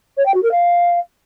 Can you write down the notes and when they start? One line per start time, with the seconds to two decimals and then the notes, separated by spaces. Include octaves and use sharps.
0.17 C#5
0.25 G5
0.34 F#4
0.42 A#4
0.51 F5